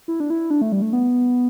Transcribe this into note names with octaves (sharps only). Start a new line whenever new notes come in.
E4
D4
E4
D4
A3
G3
A3
B3